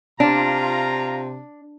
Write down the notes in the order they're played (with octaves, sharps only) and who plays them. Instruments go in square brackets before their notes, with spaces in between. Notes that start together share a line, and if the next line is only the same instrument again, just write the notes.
[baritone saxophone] C3 [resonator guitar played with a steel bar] D4 [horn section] F4 A#5